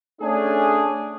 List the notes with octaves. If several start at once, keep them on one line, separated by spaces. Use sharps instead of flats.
A3 C#4 D4 G#4